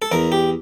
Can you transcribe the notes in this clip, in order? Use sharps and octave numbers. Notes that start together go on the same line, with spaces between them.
A4
E2 A#4
G4